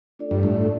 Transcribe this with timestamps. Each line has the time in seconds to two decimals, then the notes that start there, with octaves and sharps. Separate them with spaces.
0.19 A3 D4 F4 A4 D5
0.31 G2
0.43 A2